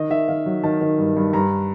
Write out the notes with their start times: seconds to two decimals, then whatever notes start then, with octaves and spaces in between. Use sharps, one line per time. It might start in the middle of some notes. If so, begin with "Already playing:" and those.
Already playing: D#3 D#5
0.10 D#3 E5
0.28 D#3 F5
0.46 F#3
0.64 D#3 A5
0.81 D#3
0.98 G2
1.17 G2
1.33 G2 A#5